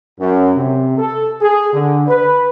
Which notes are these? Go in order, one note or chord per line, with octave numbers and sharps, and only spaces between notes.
F#2
C3
A4
G#4
D3
B4